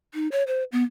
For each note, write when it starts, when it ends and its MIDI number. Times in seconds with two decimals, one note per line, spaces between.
0.14 0.28 63
0.32 0.43 73
0.47 0.64 72
0.72 0.84 59